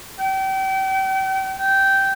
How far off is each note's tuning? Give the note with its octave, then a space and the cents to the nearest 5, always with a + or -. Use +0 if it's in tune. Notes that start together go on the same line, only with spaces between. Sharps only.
G5 -35
G5 -10